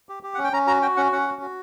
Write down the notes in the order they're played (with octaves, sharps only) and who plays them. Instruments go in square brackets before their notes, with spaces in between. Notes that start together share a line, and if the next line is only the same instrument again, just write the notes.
[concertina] G4
G4
C#4 F#5
G5
C#4 A#5
F#4 A#5
F#4 G5
C#4 F#5
C#4 F#5
F#4
F#4